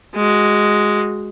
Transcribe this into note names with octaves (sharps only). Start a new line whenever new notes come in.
G#3 F#4